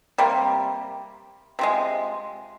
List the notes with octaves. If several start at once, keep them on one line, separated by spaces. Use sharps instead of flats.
C3 G3 A#3
C3 F3 G#3